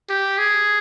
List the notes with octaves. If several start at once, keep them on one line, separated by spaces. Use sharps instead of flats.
G4
G#4